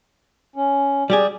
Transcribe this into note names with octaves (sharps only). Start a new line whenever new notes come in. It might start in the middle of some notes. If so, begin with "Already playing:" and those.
C#4
G3 G4 G#4 D5